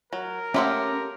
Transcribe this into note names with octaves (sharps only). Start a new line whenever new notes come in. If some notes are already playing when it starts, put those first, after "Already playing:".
F#3 A#4
A3 A#3 C#4 G4 F#5 C6 E6